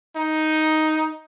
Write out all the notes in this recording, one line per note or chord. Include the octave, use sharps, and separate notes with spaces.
D#4